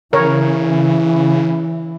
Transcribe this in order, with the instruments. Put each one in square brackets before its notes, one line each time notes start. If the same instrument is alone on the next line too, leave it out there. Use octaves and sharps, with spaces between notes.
[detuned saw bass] C#3 [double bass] E3 [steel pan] A#4 C#5 A#5